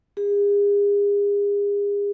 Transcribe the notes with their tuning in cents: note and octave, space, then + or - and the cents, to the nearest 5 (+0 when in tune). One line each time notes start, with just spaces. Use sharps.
G#4 -40